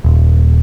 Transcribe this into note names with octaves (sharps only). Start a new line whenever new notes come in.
D#1